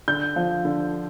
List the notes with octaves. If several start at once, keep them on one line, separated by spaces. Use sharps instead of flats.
D3 G6
F3
D3